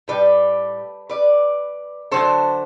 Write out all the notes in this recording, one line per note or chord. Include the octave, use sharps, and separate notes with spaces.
A2 G3 B4 D5
B4 D5
D3 F#3 A3 A4 C5